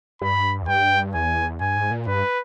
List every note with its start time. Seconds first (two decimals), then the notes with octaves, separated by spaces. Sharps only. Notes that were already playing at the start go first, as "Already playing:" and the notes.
0.21 G2 B5
0.62 E2
0.68 G2 G5
1.14 E2 G#5
1.61 G2 G#5
1.76 G#2
1.91 A#2
2.07 G2 B4